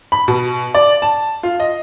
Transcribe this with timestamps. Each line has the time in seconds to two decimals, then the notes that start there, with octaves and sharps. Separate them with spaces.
0.12 B5
0.28 B2
0.74 D5
1.02 A5
1.43 F4
1.60 D#5